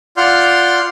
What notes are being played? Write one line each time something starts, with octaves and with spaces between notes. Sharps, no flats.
F4 D5 F#5 C6 F6 G6